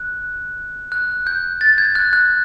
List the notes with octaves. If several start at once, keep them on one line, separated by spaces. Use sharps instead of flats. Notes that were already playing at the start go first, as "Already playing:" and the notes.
Already playing: F#6
F#6
G6
A6
G#6
F#6
F#6